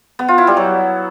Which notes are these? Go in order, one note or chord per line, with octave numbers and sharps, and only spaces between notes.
B3
F4
E4
G3
F#3